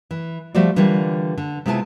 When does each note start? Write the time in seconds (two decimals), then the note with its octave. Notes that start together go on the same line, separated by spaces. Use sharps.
0.11 E3
0.55 F3 G3 A3 F#4 C5 D5
0.76 D3 E3 G3 F4 A#4 C#5
1.38 D3
1.66 C3 G#3 B3 E4 F4 A5